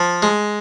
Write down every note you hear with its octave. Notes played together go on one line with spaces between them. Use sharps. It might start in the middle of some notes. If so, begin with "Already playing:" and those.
Already playing: F3
G#3